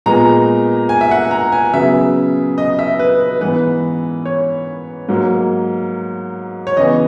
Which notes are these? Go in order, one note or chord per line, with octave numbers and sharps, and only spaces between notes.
A#2 G#3 B3 A#5
G#5
E5
F#5
A#5
G#5
C#3 F#3 B3 E5
D#5
E5
B4
B4
G#2 E3 B3 B4
C#5
G#2 F#3 A#3
C#5
C#3 E3 B3 D#5